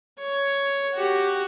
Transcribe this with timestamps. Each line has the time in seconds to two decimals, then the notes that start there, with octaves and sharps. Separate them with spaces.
0.19 C#5
0.94 F#4 G4